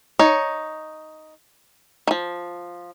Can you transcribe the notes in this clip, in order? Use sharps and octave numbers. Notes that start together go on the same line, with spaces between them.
D#4 C#5
D#3 F3